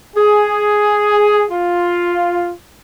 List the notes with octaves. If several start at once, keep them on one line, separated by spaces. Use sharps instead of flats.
G#4
F4